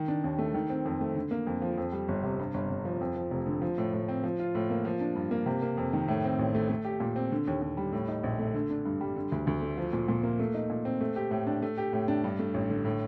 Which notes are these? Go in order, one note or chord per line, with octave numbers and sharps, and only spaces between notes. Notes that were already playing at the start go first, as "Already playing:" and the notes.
Already playing: D#3
D4
D#2
A3
D#3
C4
F2
A3
D3
A#3
F2
F3
F2
G3
G1
C3
G2
G1
G1
F3
F2
F3
F1
D3
F3
A2
A2
C4
F3
F4
A2
A#3
F3
D4
G2
A#3
C3
A#3
F2
D#3
A2
C4
A1
A3
A3
G4
A#2
C4
D3
D#2
D#2
G3
A2
D#4
A#1
A3
D3
D4
G2
G3
D3
D2
D2
A3
F3
A#2
A#2
A#3
A3
D#4
A#2
C4
A3
G4
A2
D4
A3
G4
A2
D4
G2
A3
A1
D3
A2